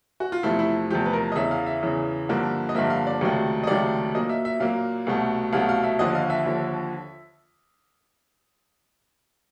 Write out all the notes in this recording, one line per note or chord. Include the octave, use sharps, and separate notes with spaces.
F#4
F4
E2 C3 F3 A3 E4
E4
E2 C3 F3 A3 G4
B4
A#4
D#5
E2 C#3 E3 E5
F5
E5
E2 C#3 E3
G2 D3 F3 A#3
D#5
G2 D3 F3 A#3 E5
F5
D5
C#2 C3 D#3 F#3 A3
D#5
C#2 C3 D#3 F#3 A3 D5
A#2 F#3 A#3 D#5
E5
E5
A#2 F#3 A#3 F5
C2 B2 F#3 A3
C2 B2 F#3 A3 F5
F5
E5
D#2 D3 F3 D#5
F5
E5
D#2 D3 F3